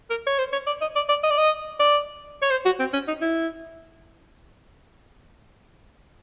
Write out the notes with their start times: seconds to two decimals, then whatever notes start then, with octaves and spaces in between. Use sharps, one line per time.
0.10 A#4
0.27 C#5
0.38 C5
0.53 C#5
0.67 D5
0.81 D#5
0.96 D5
1.09 D5
1.23 D#5
1.31 D5
1.38 D#5
1.80 D5
2.42 C#5
2.51 C5
2.65 F#4
2.79 C4
2.93 C#4
3.07 D#4
3.22 E4